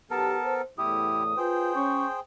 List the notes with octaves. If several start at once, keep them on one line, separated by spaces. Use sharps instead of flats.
B1 B3 G4 A4 A#4 A5
C5
E2 A2 E4 G4 D#6
F4 G#4 B4 C5 G5
C#4 C#6